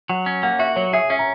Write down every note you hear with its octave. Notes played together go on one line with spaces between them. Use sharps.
F#3 F#5
C#4
A#3 F#5
F#4 E5
F#3 C#5
G#4 E5
C#4 E5
A#5